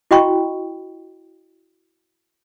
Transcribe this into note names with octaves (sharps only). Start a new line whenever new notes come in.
E4 F#4 D#5 G5 B5 C#6